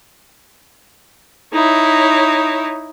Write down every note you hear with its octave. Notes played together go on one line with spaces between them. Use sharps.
D#4 E4 C#5